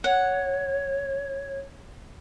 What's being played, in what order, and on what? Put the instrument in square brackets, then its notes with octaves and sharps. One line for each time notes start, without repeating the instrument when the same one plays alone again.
[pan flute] C#5 [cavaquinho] F#5